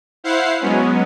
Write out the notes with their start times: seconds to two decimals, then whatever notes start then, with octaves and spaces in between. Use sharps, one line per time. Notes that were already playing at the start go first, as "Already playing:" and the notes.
0.24 E4 C5 F5 F#5 C7
0.60 F#3 G#3 B3 C#4